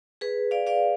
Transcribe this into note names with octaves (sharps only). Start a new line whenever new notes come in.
G#4 B4
D5 F5
D5 F5